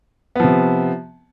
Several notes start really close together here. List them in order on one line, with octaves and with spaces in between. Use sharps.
B3 F3 C3